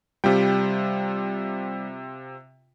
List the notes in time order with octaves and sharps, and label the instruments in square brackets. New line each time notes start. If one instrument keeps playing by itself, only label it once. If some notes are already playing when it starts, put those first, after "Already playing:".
[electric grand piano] C3 F4 G5 [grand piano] G3